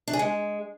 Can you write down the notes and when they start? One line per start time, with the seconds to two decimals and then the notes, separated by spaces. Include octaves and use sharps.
0.08 D4
0.13 G#4
0.19 G#3